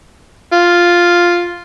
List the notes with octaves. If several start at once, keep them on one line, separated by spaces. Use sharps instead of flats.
F4